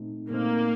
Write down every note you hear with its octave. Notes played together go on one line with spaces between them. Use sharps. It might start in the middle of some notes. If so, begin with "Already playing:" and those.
Already playing: A#2 A3 C4 D#4
A#2 A3 A#3 C4 D#4